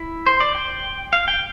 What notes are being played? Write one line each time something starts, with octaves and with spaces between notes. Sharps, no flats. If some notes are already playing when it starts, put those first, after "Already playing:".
Already playing: E4
C5
D5
G5
F5
G5